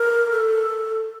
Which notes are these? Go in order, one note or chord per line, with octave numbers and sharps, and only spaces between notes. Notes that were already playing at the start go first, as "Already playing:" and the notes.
Already playing: A#4
A4